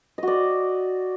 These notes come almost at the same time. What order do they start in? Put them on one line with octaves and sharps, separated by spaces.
D#5 F#4 D5